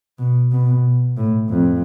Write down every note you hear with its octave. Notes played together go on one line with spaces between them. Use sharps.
B2
B2
A2
F2